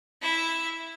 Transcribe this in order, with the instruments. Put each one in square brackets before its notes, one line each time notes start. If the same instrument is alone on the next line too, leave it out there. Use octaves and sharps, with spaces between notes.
[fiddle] E4 E5